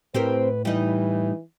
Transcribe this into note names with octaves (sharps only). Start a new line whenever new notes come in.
A2 C4 G4 A#4 B4
E3 G3 D#4